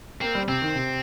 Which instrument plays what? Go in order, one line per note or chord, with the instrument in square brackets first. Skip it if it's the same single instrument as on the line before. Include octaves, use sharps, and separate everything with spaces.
[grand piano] A#3 [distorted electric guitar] C4
[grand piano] G3
[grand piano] C3 [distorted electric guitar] C4
[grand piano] D#3
C3